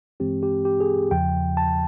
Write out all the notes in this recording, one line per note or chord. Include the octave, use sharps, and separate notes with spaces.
G2 E3 G#3 C4 G4
G4
G4
G#4
E2 C#3 F3 G5
A5